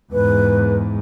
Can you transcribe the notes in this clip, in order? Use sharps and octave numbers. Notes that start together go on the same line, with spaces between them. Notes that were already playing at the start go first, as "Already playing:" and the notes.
E2 G#2 B4